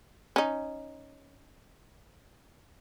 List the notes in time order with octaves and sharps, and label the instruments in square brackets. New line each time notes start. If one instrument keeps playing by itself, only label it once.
[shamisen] C#4 D#4